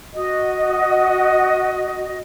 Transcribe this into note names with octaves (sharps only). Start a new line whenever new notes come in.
F#4 D#5